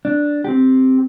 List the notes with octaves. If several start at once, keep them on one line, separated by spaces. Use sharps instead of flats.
D4
C4 G4